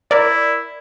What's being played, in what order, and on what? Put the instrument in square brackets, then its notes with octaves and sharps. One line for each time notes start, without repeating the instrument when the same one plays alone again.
[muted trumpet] E4 [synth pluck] A#4 D5